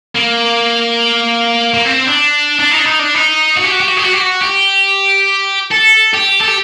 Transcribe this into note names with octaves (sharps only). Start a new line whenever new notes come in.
A#3
A#3
C4
D4
D4
D#4
D4
D#4
D4
D#4
F#4
G4
F#4
G4
F#4
G4
F#4
G4
F#4
G4
A4
G4
A4
G4